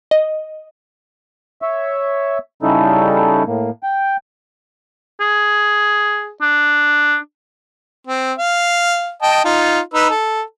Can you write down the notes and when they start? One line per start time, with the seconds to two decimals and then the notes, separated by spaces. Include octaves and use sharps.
0.11 D#5
1.62 C#5 E5
2.62 C#3 G3 C#4 D#4 E4 A4
3.47 A2 A#3
3.83 G5
5.21 G#4
6.42 D4
8.07 C4
8.38 F5
9.22 D#5 G5 A5
9.45 D#4 F4
9.94 D#4 B4 E6
10.10 A4